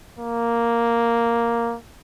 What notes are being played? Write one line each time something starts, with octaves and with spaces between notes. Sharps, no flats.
A#3